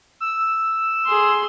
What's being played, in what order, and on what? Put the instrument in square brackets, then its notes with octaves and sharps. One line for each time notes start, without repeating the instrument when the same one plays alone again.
[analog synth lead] E6
[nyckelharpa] G#4 C6